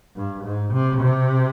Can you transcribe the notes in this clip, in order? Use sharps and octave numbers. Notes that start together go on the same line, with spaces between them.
G2
G#2
C3
C3